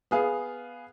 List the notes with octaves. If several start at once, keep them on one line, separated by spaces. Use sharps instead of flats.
B3 G#4 F5